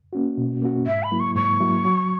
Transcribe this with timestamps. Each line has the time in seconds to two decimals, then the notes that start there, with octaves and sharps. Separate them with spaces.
0.13 A#3 C#4 F#4
0.38 B2
0.62 A#3 C#4 F#4
0.86 G#2 E5
1.03 B5
1.11 F#3 A#3 E4
1.20 C#6
1.35 G#2 C#6
1.60 F#3 A#3 E4
1.85 F#3